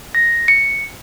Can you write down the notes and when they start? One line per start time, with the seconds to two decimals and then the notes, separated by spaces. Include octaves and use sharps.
0.15 A#6
0.48 C#7